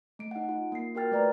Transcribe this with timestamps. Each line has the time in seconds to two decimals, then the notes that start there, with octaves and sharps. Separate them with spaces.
0.19 A3 D7
0.31 D#4 F#5
0.49 F4
0.72 A#3 C7
0.95 F4 F#4 A#4 G5 F6 A6
1.11 A3 B4 D5 A#5